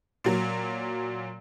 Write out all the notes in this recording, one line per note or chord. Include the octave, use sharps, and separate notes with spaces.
A#2 F#3